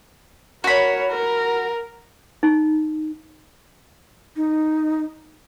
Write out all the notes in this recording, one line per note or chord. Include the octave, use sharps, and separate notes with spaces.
F#4 A#4 C#5 B5
A#4
D#4
D#4